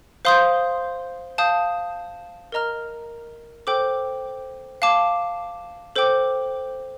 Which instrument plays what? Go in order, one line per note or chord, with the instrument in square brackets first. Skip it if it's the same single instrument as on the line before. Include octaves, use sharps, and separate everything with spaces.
[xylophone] C5 F5 C6 D#6 G6
F5 A5 D#6 G6
A#4 D#5 A#5 F6
A4 C5 G5 D6
F5 A5 D6
A4 C5 G5 D6